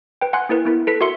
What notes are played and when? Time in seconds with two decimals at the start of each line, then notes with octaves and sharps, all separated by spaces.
0.21 B4 G5
0.33 F#5 G#5 C6 F#6
0.49 A#3 E4 A#4 B4
0.65 B3 E4 A#4
0.87 A4 B4 B6
1.01 F#4 A#4 E5 C6 C#7